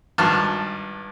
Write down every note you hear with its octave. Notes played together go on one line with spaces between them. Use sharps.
G#1 G2 A5 F6